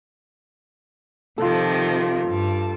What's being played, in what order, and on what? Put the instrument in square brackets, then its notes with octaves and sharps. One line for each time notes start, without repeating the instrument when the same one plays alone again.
[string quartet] C3 D#3 F3 [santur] F4 A4
[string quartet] G2 A5